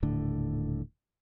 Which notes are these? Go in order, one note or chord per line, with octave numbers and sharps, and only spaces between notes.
D#1 A2 D3